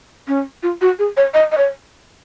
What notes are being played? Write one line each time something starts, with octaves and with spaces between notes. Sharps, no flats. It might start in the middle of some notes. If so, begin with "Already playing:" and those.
C#4
F4
F#4
G#4
C#5
D#5
D#5
C#5